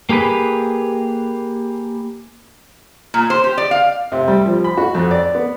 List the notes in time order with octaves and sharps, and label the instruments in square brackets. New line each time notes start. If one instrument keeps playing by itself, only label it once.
[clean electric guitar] A#3 G4 G#4 B4
[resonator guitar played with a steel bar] A#2
C5
G4
D5
F5
[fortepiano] C3
G3
F3
B5
F#4
F2
D5
B3